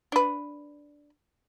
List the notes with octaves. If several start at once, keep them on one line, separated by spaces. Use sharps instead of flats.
D4 B4